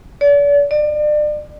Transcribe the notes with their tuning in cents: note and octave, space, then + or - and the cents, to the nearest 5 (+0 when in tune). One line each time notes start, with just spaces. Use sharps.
D5 -40
D5 +35